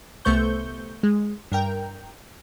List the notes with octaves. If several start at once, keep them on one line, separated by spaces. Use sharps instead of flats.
C2 A3 B3 C5 C#6 G6
G#3
G2 A#4 G5